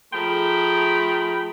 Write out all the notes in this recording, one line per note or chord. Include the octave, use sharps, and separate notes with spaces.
F3 A3 G#4 G5 A#5 B5